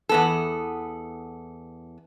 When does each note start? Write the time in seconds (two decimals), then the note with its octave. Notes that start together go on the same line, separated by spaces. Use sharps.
0.09 E2 B3 A4